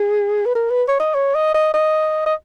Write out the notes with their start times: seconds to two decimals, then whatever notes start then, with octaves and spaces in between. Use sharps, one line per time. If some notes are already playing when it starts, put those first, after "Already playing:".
Already playing: G#4
0.46 B4
0.55 A#4
0.70 B4
0.88 C#5
1.00 D#5
1.15 C#5
1.35 D#5
1.55 D#5
1.74 D#5
2.26 D#5